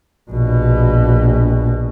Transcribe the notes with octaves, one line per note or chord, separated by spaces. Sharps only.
A#1 B2